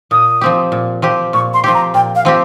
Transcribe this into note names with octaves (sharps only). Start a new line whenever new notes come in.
A#2 D#6
F3 C4 G4
A#2
F3 C4 G4
A#2 C#6
C6
F3 C4 G4 C6
A#5
A#2 G5
F5
F3 C4 G4